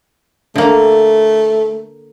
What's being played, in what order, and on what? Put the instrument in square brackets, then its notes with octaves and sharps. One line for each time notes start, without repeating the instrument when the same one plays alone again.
[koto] D3 A#3 [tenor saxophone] A3